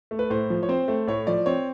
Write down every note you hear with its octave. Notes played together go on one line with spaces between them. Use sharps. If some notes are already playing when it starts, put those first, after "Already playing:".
A3
B4
A2 C5
F3
C#5
C4 C5
A3
A2 C#5
F3 D5
C4 C#5